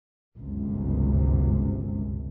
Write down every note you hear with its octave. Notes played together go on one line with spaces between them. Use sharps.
G1 C#2 F#2 C3